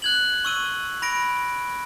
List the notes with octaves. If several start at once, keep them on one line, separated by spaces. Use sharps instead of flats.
F#6 G#6 F#7
C#6 E6 D#7
B5 A#6 D7